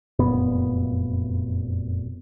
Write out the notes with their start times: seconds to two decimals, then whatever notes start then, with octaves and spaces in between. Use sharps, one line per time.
0.19 F1 F#2 A#2 B3